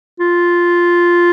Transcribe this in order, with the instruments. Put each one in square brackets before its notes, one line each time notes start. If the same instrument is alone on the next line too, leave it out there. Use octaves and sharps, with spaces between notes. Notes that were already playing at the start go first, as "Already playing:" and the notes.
[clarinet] F4